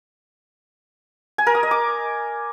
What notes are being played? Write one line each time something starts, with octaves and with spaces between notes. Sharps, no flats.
G#5
A#4
D#6
D#5
D6